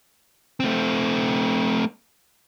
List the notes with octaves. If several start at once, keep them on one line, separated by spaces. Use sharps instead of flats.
A3 C4